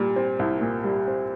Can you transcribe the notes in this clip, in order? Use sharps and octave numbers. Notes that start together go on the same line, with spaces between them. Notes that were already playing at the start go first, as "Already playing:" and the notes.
Already playing: A#2 G3
C4
C2
A#2
G3
C4